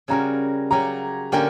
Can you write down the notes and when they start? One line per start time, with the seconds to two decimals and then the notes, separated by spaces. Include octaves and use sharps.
0.08 C#3 G3 C#4 F#4 A#4 A#5
0.71 C#3 F#3 C#4 G4 C#5 A#5
1.32 D3 A#3 C#4 G4 A#4 G5